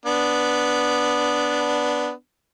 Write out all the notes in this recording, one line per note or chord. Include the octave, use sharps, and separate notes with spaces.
B3 D4